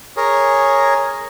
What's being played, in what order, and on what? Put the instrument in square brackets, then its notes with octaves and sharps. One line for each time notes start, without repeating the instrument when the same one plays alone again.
[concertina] G#4 A#4 C#5